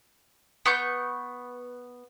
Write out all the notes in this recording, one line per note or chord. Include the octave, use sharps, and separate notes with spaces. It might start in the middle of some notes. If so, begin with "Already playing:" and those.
B3 C#6 G6